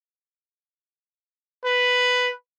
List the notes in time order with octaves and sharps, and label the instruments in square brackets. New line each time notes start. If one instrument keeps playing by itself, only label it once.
[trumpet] B4